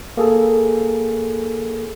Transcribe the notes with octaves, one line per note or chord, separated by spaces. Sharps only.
A#3 G#4 A4